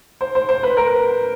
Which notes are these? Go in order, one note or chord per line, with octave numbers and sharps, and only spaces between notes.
C5
C5
C5
B4
A#4